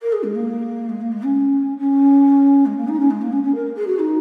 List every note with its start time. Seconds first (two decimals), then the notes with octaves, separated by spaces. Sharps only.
0.02 A#4
0.12 G#4
0.23 G#3
0.35 A#3
0.89 G#3
1.00 A#3
1.12 G#3
1.22 C#4
1.77 C#4
2.65 G#3
2.76 A#3
2.88 D#4
2.99 C#4
3.10 G#3
3.21 A#3
3.32 C#4
3.43 C#4
3.54 A#4
3.76 G#4
3.86 F#4
3.99 D#4